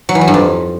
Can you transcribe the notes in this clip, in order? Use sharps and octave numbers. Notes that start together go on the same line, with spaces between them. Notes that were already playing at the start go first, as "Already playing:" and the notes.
F#3
E3
F#3
G2
F2